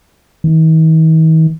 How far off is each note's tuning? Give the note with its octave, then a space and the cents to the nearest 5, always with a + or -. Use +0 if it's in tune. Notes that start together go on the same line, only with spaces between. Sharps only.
D#3 +45